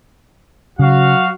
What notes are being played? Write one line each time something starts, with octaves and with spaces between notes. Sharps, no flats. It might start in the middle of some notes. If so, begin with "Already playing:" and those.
C#3 F#3 F#4 F5